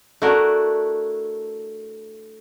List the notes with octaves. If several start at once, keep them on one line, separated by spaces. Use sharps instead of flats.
A3 D4 E4 F#4 A#4